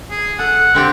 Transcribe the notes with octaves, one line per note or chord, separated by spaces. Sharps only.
G#4
A4 F#5
D3 C4 G4